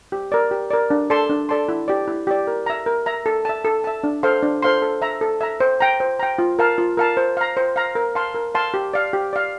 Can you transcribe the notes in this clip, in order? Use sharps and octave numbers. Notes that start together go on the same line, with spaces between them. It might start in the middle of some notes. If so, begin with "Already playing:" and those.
G4
A#4 D5
G4
A#4 D5
D4
A4 D5 A5 C6
D4
A4 D5 A5 C6
E4
G4 D5
E4
G4 D5
A#4
E5 A#5
A#4
E5 A#5
A4
E5 A5
A4
E5 A5
D4
A4 C5 F5 C6
D4
A4 C5 F5 C6
A4
E5 A#5
A4
E5 A#5
C5
G5 A#5
C5
G5 A#5
F4
A#4 F5 A5
F4
A#4 F5 A5
C5
F5 A#5
C5
F5 A#5
A#4
F5 A5 C6
A#4
F5 A5 C6
G4
D5 F5
G4
D5 F5